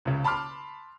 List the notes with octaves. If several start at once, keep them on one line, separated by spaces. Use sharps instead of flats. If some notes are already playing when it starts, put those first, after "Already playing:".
C#2 C#3
A5 B5 C6 D6 F6